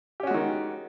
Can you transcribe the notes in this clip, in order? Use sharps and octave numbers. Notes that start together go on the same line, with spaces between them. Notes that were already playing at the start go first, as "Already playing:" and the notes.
D#3 G#3 C#4 F#4 G4